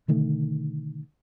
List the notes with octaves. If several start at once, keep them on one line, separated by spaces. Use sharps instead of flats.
B2 D3 D#3 A3